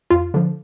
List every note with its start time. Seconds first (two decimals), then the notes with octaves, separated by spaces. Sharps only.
0.11 F2 F4
0.34 D3 F3